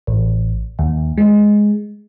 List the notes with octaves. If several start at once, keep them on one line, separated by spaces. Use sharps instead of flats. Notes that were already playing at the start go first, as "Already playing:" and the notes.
A1
D#2
G#3